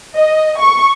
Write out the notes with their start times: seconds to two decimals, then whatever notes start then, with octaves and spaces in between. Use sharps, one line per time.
0.16 D#5
0.59 C#6